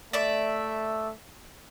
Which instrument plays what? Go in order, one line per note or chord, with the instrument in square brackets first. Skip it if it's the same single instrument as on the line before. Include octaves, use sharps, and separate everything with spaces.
[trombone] A3 [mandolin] D5 E5